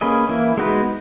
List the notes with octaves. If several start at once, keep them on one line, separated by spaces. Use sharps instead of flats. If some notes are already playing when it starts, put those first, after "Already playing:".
A#3 C#4 G#4 B4 D#5
E3 A#3 E4
G#3 B3 D#4 F#4 B4